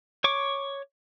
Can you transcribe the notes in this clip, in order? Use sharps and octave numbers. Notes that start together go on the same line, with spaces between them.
C#5 C#6 D6